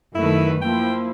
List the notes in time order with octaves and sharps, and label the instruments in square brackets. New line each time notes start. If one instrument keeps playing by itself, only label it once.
[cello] F#2 D#3 [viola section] A3 B4 [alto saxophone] E4
[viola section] F3 E4 [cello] A#3 [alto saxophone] G5